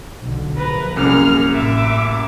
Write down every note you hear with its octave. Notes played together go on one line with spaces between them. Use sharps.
B1 D3
A#1 A#4 B4
C2 F#2 A#3 G#4 F6
A1 E5 D6